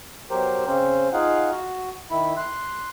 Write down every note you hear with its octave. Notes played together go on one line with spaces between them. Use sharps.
B2 F#3 G4 A#4 C5
C#3 C4 C#4 C5
D#4 F4 G#4 F5 F#5
F#4
D#3 E4 B5
C6 F#6